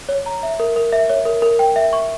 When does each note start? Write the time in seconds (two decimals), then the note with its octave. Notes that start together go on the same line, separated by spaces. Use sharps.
0.09 C#5
0.26 A#5
0.43 E5
0.60 A#4
0.76 A#4
0.92 E5
1.10 C#5
1.26 A#4
1.42 A#4
1.59 G5
1.76 E5
1.93 C#6